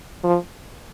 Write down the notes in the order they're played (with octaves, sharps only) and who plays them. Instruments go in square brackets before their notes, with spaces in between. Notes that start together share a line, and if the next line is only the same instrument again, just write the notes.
[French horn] F3